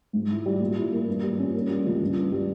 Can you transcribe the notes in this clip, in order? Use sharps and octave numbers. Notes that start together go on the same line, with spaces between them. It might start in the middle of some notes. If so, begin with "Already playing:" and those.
G#2
E4
G3
A#2
E4
A#3
G2
G3
C#4
A#3
G3
C#2
G2
G2
G3